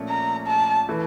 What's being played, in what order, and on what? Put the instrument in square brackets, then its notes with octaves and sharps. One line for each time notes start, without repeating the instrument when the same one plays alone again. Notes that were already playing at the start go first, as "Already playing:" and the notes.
Already playing: [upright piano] A#1 A#2 A3 C#4
[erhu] A#5
A5
[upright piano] E3 A3